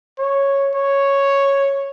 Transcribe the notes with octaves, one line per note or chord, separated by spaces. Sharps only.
C#5
C#5